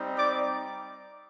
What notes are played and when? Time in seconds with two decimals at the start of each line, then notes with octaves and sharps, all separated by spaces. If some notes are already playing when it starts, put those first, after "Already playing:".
Already playing: G3 C4 D#4
0.17 D5 D6